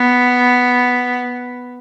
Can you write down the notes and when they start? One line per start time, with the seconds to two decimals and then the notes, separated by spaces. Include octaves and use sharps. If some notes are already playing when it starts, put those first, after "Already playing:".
Already playing: B3